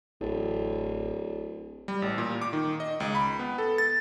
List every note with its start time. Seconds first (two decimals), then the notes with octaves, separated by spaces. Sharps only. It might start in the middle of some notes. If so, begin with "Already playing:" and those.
0.21 D1 A1
1.88 G3
2.02 A1
2.18 A#2
2.42 D6
2.53 D#3
2.80 D#5
3.00 C#2
3.15 B5
3.39 B3
3.58 A4
3.78 A6